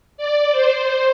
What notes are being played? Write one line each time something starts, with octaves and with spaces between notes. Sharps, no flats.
D5
C5